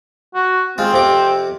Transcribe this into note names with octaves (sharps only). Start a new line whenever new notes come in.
F#4
G#3 C4 F4
F2 C3 D6